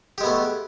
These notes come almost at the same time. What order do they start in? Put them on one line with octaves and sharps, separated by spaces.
G4 G#3 B3 A3